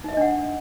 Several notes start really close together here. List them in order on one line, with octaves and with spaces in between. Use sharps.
D#4 E5 D#5 D4 F#5